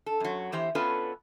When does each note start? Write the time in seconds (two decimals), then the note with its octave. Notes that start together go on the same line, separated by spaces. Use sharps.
0.06 A4
0.20 F#2 F#3
0.52 E2 E3 G4 C5
0.75 B3 C#4 D4 F4 A4 B4